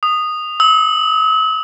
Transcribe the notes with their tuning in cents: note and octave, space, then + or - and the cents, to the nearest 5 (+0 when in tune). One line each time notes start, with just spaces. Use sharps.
D#6 -10
E6 -45